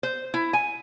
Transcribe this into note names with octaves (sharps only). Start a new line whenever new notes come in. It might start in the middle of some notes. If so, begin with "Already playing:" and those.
C5
E4
G#5